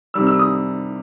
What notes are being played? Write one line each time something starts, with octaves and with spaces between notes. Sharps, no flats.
C3 D#3 G3 E6
E6
D#6